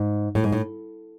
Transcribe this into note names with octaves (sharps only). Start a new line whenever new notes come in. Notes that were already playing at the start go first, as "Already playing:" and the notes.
Already playing: G#2
A2
G#2
A2